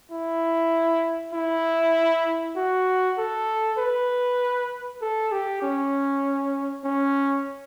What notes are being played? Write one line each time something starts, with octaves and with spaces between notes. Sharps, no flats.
E4
E4
F#4
A4
B4
A4
G4
C#4
C#4